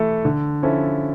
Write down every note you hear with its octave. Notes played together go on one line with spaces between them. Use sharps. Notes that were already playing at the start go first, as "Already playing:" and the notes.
Already playing: E3 A3 E4 A4
D3
F3 C#4 E4 A4